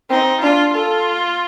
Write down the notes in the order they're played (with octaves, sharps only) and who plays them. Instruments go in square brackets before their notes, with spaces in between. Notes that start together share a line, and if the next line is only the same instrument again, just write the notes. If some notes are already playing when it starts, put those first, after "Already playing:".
[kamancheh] C4 [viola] D#4
[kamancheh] D4 [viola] F4
[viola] F4 [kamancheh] A4